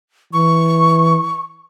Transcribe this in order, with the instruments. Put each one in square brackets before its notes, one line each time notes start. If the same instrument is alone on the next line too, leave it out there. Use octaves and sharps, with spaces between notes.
[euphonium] E3 [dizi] C#6